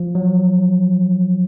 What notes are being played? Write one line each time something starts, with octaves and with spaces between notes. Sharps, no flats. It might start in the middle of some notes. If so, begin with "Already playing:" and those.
Already playing: F3
F#3